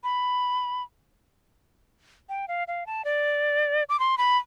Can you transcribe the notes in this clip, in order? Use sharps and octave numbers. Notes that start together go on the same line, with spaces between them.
B5
G5
F5
F5
A5
D5
D6
C6
B5